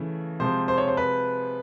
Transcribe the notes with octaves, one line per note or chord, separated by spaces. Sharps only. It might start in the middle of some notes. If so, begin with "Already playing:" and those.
Already playing: C#3 E3 A3
C3 F3 G#3 C5
C5
C#5
C5
B4